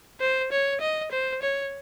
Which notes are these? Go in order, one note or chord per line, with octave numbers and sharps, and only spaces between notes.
C5
C#5
D#5
C5
C#5